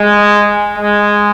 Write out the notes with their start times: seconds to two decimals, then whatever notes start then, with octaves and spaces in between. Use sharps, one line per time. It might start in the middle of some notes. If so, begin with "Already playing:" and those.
Already playing: G#3
0.76 G#3